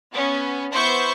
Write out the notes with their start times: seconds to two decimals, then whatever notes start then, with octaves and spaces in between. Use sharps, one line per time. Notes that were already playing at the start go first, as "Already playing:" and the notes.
0.12 B3 C#4
0.73 B3 E4 C5 C#6 G6